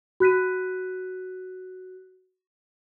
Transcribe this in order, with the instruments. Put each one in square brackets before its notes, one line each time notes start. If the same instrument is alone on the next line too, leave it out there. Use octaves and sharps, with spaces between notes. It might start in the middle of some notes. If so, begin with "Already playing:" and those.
[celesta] F#4 F#6 B6 D#7